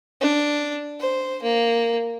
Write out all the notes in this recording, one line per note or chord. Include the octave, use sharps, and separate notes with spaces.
D4
C5
A#3